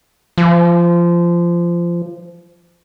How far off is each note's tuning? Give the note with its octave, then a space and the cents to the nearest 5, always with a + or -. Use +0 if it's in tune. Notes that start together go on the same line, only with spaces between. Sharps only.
F3 -20